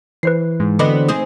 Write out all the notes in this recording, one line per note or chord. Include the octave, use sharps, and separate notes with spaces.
E3 B4 C5 C7
G#2
D3 B3 C4 F#4 D#5 B5 D6
C4 D#4 G#4 D#6